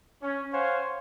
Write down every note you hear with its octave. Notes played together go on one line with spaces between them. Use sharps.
C#4
C5 C#5 F5 F#5 G#5